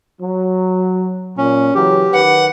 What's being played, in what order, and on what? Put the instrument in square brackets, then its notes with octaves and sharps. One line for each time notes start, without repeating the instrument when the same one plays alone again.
[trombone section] F#3
[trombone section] A#2 [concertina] C#4
[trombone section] C#3 E3 F#3 [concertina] G4
[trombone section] D#3 B4 [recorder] F#5